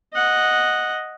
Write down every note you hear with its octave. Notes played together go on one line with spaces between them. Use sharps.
D#5 F#5